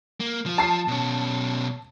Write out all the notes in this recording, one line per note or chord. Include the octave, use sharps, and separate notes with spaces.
A#3
F3 F4
A5 C7
B2 C#4